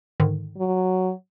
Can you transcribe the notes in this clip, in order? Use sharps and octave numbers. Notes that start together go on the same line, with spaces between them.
G#2 D3 D#3
F#3